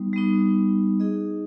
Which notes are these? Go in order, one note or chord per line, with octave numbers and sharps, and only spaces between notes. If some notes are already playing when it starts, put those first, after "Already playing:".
Already playing: G3 B3 D#4
G3 B3 D#4
D#4 G#4 D#5